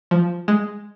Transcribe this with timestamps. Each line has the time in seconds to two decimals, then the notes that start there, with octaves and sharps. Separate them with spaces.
0.11 F3
0.48 G#3